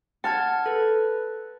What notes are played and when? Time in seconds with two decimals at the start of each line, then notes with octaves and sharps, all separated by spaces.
0.24 F#5 A5 F6 G#6
0.66 A4 B4